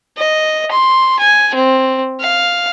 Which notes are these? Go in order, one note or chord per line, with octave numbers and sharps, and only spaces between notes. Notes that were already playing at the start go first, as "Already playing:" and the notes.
D#5
C6
G#5
C4
F5